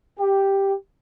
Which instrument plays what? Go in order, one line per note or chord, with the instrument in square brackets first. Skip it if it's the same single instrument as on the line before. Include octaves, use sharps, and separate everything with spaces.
[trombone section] G4